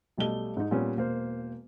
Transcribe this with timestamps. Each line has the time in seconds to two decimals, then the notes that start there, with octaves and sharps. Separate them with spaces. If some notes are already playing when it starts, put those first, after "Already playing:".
0.18 B1 G3 A3 D#5 G7
0.57 G#2 D#4
0.71 A#2 G3 B3 C#4
0.96 E1 A#3 C5